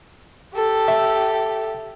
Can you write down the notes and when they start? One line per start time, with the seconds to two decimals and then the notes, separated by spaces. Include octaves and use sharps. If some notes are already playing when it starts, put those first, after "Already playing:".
0.55 G4 A4
0.88 E5